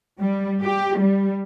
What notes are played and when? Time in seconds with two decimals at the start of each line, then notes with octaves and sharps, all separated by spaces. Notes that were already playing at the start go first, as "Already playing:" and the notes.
0.19 G3
0.62 G4
1.00 G3